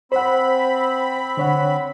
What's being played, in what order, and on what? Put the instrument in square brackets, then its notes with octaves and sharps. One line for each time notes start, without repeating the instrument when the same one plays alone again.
[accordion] C4 B5 [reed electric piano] C5 F#5
[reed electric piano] D3 C#5 F#5